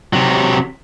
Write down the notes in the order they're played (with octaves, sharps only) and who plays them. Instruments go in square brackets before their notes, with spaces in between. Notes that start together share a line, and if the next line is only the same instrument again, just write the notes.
[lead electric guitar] C3 F#3